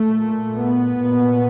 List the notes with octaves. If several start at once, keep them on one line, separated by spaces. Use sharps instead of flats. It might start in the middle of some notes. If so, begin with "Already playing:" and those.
Already playing: A3
A#2
B3
A#2